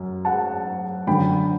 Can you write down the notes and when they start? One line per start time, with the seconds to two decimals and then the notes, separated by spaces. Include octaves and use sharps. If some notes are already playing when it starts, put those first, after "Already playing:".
Already playing: F#2
0.25 F#5 A5
1.07 F#2 D3 G5 B5